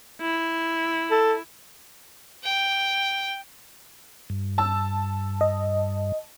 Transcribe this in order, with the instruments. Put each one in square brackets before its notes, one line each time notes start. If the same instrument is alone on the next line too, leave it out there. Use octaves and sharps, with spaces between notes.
[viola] E4
[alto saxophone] A4
[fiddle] G5
[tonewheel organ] G2
[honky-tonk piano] A5 E6
[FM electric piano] D#5